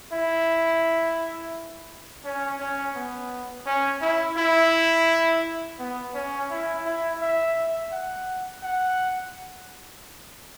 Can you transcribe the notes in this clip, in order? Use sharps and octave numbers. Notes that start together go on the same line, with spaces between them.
E4
C#4
C#4
B3
C#4
E4
E4
B3
C#4
E4
E4
E5
F#5
F#5